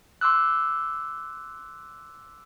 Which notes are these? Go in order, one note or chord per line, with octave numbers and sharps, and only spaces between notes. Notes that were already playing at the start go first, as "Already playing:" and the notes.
C6 D6 E6 F#6